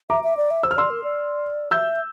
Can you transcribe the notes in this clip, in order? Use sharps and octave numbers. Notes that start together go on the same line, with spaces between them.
E5 A#5 D6
E5
D5
E5
C5 E6
F6
D5 C6 E6
A#4
D5
E5 E6 G6